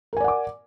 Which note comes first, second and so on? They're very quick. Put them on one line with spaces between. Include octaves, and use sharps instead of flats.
A#4 G#5 D5 F#5 D6